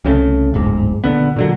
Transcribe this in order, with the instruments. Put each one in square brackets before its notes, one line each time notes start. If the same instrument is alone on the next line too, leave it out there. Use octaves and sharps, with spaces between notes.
[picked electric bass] C2 C#3 G3 A3
D1 G1 G#2
A#1 D#2 D3 B3
A#2 D3 F#3